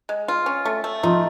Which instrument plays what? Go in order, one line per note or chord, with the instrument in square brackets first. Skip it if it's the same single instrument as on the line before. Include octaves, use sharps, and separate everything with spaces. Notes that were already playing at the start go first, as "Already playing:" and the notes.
[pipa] G#3
F4
C#4
A3
A3
[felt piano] F3 F4 [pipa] D#4